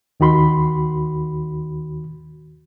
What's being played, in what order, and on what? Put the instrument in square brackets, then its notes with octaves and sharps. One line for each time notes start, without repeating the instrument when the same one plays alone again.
[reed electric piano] D#2 D#3 F#4 B5 C6